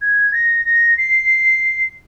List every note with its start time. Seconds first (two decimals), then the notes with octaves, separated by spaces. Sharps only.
0.01 G#6
0.33 A#6
0.65 A#6
0.98 C7